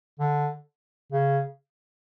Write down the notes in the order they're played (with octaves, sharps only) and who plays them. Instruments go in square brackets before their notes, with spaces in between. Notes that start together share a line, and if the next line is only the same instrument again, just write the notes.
[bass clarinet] D3
C#3